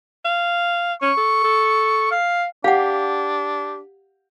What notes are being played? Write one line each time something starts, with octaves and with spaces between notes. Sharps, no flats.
F5
C#4 C#6
A4
A4
F5
D4 G4 F5 F#5